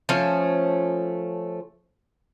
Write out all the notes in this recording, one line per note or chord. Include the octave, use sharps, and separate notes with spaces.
F3 A3 C#4